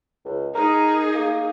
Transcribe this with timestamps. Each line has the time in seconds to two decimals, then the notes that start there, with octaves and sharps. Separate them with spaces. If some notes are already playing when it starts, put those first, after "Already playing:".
0.25 C#2
0.55 D#4 G#4 A#4
1.15 A#3